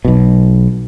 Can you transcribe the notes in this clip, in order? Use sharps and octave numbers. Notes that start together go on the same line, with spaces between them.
B1 B2